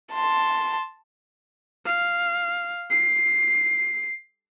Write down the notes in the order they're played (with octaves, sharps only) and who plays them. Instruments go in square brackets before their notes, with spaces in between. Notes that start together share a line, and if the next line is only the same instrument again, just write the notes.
[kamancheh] A5 C6
[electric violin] F5
C7